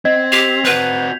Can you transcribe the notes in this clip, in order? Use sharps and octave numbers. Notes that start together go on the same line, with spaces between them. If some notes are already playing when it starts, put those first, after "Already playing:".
C4 D#5 G#6
G4 B6 C7 F7
C4 F#4 B4 G6